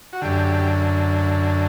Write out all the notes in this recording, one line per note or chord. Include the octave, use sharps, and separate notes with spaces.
F#4
F#2 D3 G4